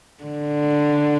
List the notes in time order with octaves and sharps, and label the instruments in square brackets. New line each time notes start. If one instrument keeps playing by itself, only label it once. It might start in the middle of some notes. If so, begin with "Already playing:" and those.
[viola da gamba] D3